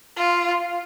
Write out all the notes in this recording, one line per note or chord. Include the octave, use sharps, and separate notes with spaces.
F4